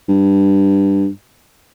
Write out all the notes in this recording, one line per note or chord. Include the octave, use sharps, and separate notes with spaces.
G2